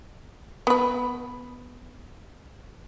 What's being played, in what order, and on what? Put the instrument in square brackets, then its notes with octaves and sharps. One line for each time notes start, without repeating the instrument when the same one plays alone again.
[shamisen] B3 B4